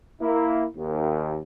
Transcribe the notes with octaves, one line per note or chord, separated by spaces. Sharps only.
A#3 E4
D#2